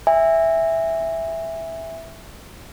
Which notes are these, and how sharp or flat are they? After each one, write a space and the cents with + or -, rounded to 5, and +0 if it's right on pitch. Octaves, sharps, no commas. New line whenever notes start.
E5 +0 G#5 -35